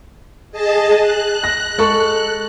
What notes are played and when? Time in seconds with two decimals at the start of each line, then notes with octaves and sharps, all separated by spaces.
0.52 G#4 D#5 A5
1.00 F#6
1.44 A#6
1.78 G#3 A4 C#6